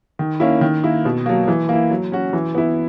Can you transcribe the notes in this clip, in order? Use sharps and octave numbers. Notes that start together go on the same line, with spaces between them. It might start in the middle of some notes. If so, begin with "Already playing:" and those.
D#3
A#3 C#4 E4
D#3
A#3 E4
B2
F#3 A#3
E3
A#3 E4
F#3
C#4 F#4
E3
B3 E4